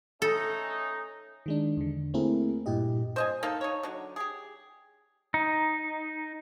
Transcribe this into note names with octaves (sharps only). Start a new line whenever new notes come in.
A3 C#4 D#4 A4
D#3 G#3 D4
E2 D3
A3 A#3 C4 E4 G#4 A#4
G2 A#2 E4 G4 D#5
C5 D#5 G#5
A#3 D#4 A4
D#4 C#5
D3 F#3
G4 G#4
D#4